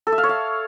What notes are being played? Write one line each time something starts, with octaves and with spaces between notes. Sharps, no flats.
A4
E5
F5
C#5
F5